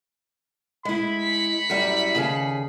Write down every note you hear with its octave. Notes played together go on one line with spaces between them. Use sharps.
G#3 E4 B5
B6 C#7
F#2 G3 E4
D#2 C#3 G#4